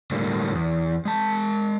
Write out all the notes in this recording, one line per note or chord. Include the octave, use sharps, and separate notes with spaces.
A2 D3 G3 A#3
E2
G#3 A5